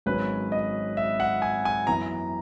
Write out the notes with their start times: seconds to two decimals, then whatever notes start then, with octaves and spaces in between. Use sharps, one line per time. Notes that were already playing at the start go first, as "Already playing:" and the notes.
0.06 G#1 G#2 F#3 C#4 B4
0.52 D#5
0.97 E5
1.20 F#5
1.42 G#5
1.65 G#5
1.87 F#2 E3 B3 A#5